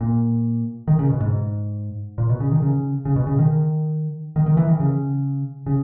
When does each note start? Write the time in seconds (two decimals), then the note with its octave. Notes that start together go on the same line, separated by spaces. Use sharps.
0.01 A#2
0.88 D#3
0.99 C#3
1.10 B2
1.20 G#2
2.18 A#2
2.29 B2
2.40 C#3
2.52 D#3
2.62 C#3
3.05 C#3
3.16 B2
3.27 C#3
3.39 D#3
4.36 D#3
4.46 D#3
4.57 E3
4.69 D#3
4.80 C#3
5.66 C#3